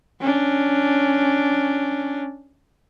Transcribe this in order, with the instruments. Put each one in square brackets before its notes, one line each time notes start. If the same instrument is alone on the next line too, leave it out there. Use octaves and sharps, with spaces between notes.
[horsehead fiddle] C#4 D4